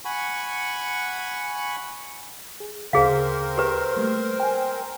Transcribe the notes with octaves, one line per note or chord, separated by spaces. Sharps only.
F#5 G#5 B5 C#6
G#4
D2 C#3 C4 G#4 A#4 C5 F5
G4 B4
G3 A3 A#3
G5 G#5